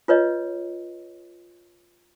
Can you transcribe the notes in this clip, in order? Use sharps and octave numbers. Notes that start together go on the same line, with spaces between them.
F4 B4 C#5 D#5